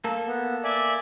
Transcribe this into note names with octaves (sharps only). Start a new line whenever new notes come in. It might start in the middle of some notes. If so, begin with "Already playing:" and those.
A#3 A4
B3
D5 E5 G#5